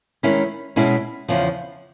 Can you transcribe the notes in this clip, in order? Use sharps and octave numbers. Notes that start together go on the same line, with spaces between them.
D#3 G#3 C#4 E4
B2 G#3 C#4 E4
E2 C#3 F3